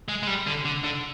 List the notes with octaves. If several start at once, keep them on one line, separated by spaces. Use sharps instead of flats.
G#3
G#3
G3
D3
D3
D3